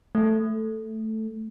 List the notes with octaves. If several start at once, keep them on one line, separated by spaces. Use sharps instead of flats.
A3